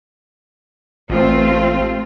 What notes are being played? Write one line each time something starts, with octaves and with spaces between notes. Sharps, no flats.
A1 A3 C4 F4